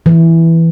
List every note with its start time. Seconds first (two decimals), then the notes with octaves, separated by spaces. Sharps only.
0.06 E3